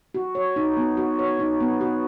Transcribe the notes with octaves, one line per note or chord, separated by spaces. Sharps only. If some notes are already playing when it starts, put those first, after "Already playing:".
F#4
C#5
D#4
B3
F#4
C#5
D#4
B3
F#4